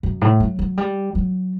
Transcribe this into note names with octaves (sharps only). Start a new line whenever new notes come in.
F#2
A2
F#3
F#3
G3
F#3